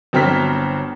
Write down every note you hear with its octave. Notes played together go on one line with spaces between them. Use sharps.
G1 F#3 C4 A#5 F6 B6